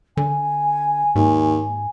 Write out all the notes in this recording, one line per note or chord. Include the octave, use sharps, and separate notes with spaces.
D3 G#5
D#2 G#2